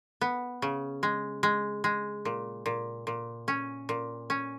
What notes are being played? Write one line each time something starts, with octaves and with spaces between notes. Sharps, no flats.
B3
C#3
G#3
G#3
G#3
A#2
A#2
A#2
C#4
A#2
C#4